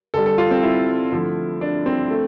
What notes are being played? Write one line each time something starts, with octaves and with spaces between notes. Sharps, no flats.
D3 G3 A4
A4
F4
C4
E4
D3 F3 A3
D4
C4
A3